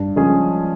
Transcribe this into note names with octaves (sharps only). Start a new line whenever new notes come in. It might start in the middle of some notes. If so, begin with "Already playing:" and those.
Already playing: G2
F3 G#3 C#4 G#4